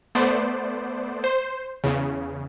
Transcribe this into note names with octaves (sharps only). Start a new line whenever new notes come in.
A3 B3 C5 D5
C5
E2 C#3